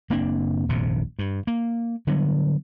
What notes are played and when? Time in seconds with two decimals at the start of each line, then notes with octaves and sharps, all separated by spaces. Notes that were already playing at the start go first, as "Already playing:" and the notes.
0.10 F#1 A#3 C4 D4
0.69 D#1 A#1 F2 C3
1.19 G2
1.47 A#3
2.07 D3 F#3 G3 B3